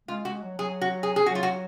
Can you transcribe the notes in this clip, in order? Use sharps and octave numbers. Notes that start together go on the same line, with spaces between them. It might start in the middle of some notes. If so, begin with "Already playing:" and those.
G#3 F4
G#3 F#4
F#3
F#3 G#4
F#4
G#4
G#4
F#3 F#4
F4
F#4